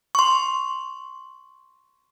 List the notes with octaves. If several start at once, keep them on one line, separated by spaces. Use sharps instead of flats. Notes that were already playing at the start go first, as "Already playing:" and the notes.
C6 C#6